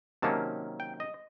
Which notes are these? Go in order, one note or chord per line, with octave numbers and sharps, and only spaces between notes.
C3 D#3 F#3 A#3 C#4 A5
G5
D#5